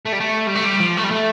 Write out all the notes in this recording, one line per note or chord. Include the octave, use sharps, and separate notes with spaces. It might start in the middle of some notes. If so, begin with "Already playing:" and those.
A3
G3
A3
G3
A3
G3
F3
A3
G3
A3